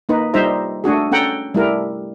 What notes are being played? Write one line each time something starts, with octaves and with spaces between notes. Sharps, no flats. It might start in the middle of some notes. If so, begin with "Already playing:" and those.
A#3 D#4 B4
G3 D#4 F4 C5 E5 A#5
A3 D4 F#4 G#4
C#4 A4 F#5 G5 A#5
G3 A3 E4 A#4